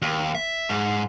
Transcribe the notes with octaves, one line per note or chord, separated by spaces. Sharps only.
D#2
E5
G#2